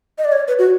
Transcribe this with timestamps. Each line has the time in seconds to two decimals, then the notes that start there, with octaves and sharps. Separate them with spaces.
0.18 D#5
0.25 D5
0.32 C#5
0.48 B4
0.59 F#4